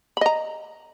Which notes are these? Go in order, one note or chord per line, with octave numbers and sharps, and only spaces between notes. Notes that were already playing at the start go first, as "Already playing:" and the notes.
D#5 A#5 B5